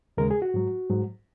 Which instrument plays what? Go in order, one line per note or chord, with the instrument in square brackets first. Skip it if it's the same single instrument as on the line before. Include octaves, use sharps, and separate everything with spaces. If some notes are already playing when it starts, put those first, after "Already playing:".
[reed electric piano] D#2 C#3 G#3 A#4
G#4
F#4
G#2 F#3
G#2 F#3